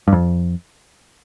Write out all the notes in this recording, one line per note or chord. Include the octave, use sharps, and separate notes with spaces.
G2
F2